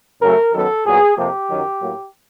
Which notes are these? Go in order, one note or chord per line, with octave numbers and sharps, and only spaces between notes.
F#2 C#3 F#3 A3 A#4
F#2 D#3 F#3 B3 A4
A#2 F#3 B3 G#4
F2 C3 F3 A#3 G4
F#2 D#3 F#3
A2 F#3 A#3